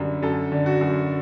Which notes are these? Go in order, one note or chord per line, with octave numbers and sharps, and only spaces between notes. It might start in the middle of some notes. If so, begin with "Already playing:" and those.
Already playing: F#2 D3 G3
F#2 A4
D3
F#4
F#2